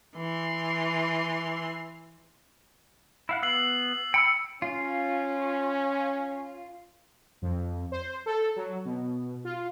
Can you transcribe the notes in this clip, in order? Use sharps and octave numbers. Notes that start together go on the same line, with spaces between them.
E3 C6
E4 F5 F#5
B3 E6 C7 F#7
G5 B5 E6 C#7
C#4 F4
F2
C5
A4
F#3
B2
F4